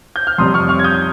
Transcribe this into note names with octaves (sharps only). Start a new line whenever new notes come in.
G6
F6
F2 C3 G3 C6 D#6
C#6 F6
C#6 F6
G#6
D#6 G6